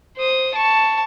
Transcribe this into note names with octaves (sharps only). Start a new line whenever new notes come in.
C5 D#6
A5 C#6